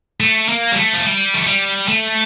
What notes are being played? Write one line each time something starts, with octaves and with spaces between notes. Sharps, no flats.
A3
A#3
G3
A3
F3
G3
A3
G3
A3